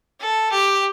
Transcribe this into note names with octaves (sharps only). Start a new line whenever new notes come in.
A4
G4